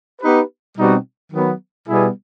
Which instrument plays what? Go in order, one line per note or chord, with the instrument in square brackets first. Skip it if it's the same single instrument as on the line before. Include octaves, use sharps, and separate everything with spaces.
[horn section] B3 D#4 G4 B4
B2 G3 C4 D#4 F#4
D#3 F#3 B3
B2 G3 B3 E4 G#4